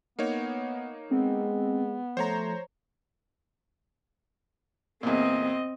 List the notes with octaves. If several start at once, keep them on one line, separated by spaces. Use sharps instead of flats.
A#3 B3 D#4 C#5
G#3 B3 C4
F3 A3 C5 C#5 A#5
E2 A#2 C4 D#5